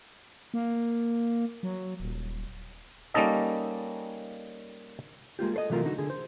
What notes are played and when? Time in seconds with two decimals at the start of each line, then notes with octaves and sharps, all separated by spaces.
0.54 A#3
1.63 F#3
2.00 D#1
3.14 G3 A#3 C#4 D#4 A4 D#5
5.39 G#3 A#3 F4 G4
5.54 A4 C5 D#5
5.70 C3 E3 F#3 A3 F4 A#4
5.85 D3 D#4 F#4
5.98 D3 G#4
6.10 C5